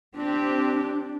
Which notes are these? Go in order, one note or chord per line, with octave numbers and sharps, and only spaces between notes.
C4 D4 G4